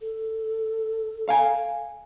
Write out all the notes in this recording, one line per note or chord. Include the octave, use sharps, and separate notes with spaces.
A4
F5 G#5